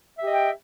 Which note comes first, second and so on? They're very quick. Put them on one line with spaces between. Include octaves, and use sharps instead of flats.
E5 G4 D#5 G5